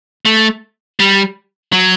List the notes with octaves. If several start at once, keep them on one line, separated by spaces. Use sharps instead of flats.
A3
G3
F#3